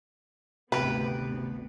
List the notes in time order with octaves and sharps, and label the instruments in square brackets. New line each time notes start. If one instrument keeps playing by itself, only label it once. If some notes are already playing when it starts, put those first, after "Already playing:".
[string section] G#1 D2 B3 [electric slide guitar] C3 [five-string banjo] G4 B4